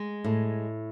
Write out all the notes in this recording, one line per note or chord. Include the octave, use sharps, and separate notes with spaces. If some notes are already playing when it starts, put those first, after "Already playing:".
Already playing: G#3
A2